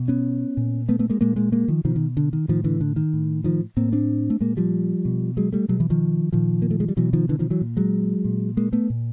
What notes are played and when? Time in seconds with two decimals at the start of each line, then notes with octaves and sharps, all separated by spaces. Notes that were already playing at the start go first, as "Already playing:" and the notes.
Already playing: B2
0.08 B3 C#4
0.57 A#2
0.89 A3 B3
0.99 A3 B3
1.10 G#3 A#3
1.21 A#2 G#3 A#3
1.36 G#3 A#3
1.52 G#3 A#3
1.68 D#3 F3
1.85 B2 D#3 F3
1.96 D#3
2.17 D3
2.33 D#3
2.48 A2 D#3 F3
2.64 D3 E3
2.81 D3
2.96 D#3
3.14 A2
3.44 D#3 F3
3.77 A2 A#3 C4
3.93 C4 D4
4.30 A3
4.41 A#2 G#3 A#3
4.57 F3 G3
5.05 B2
5.37 F#3 G#3
5.53 G3 A3
5.68 B2 F#3 G#3
5.80 E3 F#3
5.90 D#3 F3
6.33 A#2 D#3 F3
6.62 A#3
6.71 A3
6.80 G#3
6.88 G3
6.97 B2 E3 F#3
7.13 D#3 F3
7.29 D3 E3
7.39 D#3 F3
7.50 E3 F#3
7.61 A#2
7.77 F#3 G#3
8.25 A#2
8.57 G#3 A#3
8.73 A3 B3
8.90 A#2